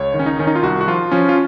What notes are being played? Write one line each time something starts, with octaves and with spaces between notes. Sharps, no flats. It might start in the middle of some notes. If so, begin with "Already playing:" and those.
Already playing: C#2 C#5
D#3
C#4
D#4
D#3 C#4
D#4
F4
C2 F#4
F#4
F3 F4
F3 C#4
F4